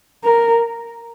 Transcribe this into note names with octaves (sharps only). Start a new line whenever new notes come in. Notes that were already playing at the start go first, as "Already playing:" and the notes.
A#4